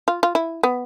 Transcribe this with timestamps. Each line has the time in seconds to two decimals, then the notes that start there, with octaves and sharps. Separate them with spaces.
0.08 F4
0.23 F4
0.35 E4
0.63 B3